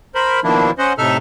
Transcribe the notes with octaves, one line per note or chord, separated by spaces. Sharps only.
A#4 C5 B5
B2 D#3 F3 A#3 D4 E4
C#4 C5 D#5 F#5
A2 C3 D#4 A4 E5 F6